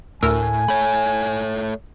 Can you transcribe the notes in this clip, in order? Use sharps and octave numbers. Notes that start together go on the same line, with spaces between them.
D2 A2 A#4 G#5 E6
A3 C#5 B5